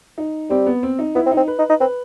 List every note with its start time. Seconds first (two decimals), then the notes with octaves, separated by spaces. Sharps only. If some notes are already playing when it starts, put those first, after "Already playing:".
0.18 D#4
0.50 G3 C4
0.66 B3
0.83 C4
0.99 D#4
1.15 B3 E4
1.26 C4
1.31 D#4
1.37 C4
1.48 B4
1.59 D#4
1.69 D#4
1.81 C4 B4